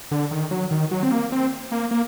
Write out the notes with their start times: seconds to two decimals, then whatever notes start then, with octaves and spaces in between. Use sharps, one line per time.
0.11 D3
0.31 D#3
0.51 F#3
0.71 D#3
0.91 F#3
1.03 C4
1.11 A#3
1.32 C4
1.72 A#3
1.91 A#3